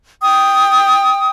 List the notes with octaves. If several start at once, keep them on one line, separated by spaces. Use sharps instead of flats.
G5 D#6